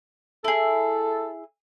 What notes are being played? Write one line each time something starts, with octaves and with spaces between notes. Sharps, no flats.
E4 G#4 A4